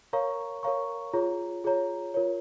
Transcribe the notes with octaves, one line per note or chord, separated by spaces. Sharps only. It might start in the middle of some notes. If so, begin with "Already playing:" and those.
A#4 C#5 F5 A#5 C#6
A#4 C#5 F5 A#5 C#6
F4 G#4 C#5 A#5
F4 G#4 C#5 A#5
F4 A#4 C#5